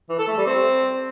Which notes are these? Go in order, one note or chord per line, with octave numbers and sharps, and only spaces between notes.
E3
A4
A3
G3
C4